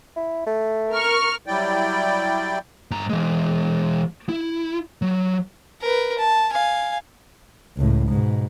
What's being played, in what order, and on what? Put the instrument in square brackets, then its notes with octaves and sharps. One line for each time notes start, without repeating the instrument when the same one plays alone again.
[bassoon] E4
A3
[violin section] A#4 C#6 F6
[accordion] F#3 G3 E4 D5 G5
[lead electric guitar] G2 A#5
E3 G#3
E4
F#3
[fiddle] A#4 B4
A5
F5 G#5
[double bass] C#2 A2
G#2 B2